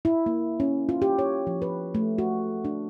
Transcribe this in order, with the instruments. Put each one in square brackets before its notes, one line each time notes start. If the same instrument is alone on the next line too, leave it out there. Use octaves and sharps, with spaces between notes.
[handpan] E4
A#3
C#4
F4
G4
C#5
F3
B4
A3
F#4
D4